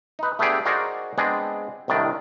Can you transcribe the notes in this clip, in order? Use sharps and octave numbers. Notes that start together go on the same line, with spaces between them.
D#4 B4
A3 B3 D4 G4 G#4 D5
D#4 F#4 G#4 A#4 C5 D5
G#3 B3 C4 D4 G#4
C2 A2 D#3 D4 D5